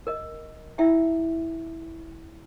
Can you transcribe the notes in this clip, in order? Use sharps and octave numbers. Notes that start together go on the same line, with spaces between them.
A#4 D#5
E4 E5 F5 G5